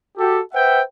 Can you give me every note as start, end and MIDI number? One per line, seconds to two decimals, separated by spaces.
0.18 0.40 66
0.18 0.40 67
0.18 0.40 69
0.54 0.81 71
0.54 0.81 72
0.54 0.81 76
0.54 0.81 78
0.54 0.81 79